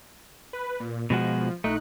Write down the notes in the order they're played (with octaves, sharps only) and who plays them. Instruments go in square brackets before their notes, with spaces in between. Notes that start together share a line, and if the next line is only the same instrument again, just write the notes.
[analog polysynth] B4
A#2
[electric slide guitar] B2 G#3 F#4 [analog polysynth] F3
[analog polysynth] A#1 D#4 F#6 [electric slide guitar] A3